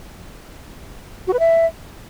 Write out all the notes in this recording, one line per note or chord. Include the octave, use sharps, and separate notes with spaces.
F#4
B4
E5